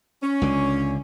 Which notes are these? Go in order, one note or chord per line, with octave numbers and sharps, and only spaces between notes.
C#4
C#2 D3